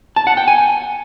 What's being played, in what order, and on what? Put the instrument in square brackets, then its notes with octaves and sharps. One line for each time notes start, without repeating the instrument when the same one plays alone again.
[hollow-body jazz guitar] A5
F#5
G5
G#5